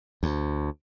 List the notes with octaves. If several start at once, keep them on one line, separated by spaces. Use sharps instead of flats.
D2